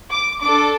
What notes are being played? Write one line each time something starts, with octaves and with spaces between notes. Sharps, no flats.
D6
D4 A4 D6